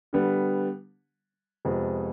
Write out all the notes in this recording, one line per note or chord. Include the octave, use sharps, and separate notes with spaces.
D3 G3 B3
F2 C3 F3 G#3 B3